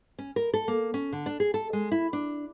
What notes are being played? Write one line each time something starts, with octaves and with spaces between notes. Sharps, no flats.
C#4
A#4
A4
A#3
C#4
D3
D4
G#4
A4
G#3
E4
D4